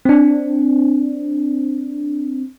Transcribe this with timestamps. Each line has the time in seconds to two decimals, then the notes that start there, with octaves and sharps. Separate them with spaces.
0.05 C4 D4